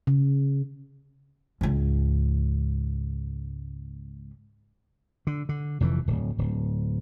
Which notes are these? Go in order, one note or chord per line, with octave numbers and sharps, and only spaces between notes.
C#3
C#2 G#2
D3
D3
F1 F2 B2 E3
D1
D1